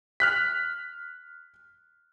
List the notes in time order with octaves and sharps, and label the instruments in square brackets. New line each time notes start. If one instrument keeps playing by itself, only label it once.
[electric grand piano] F6 F#6 B6